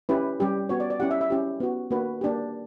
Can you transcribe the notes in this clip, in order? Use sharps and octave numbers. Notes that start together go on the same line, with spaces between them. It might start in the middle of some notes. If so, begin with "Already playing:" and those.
C#4 E4 G4 B4
G3 C#4 G4
B3 F#4 C#5
D5
D5
C#4 E4 G4 F#5
E5
E5
C#4 E4 G4
B3 F#4
A#3 D4 F#4 B4
A#3 D4 G4